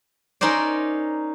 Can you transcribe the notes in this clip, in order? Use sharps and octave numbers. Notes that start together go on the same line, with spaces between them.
C#4 D#4 A#4 C5 D5